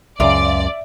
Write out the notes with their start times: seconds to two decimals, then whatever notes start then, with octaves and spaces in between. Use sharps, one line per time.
0.20 C#2 F#2 C#3 F4 A#4 D5 E5 D6